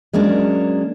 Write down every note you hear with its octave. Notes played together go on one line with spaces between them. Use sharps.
F#3 G#3 A#3 C#4 D4